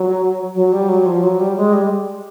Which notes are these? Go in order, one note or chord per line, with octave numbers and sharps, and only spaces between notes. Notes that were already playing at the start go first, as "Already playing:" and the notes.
Already playing: F#3
F#3
G3
F#3
F3
F#3
G3
G#3
G3